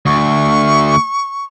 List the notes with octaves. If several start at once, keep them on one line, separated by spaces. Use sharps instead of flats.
D2 C#6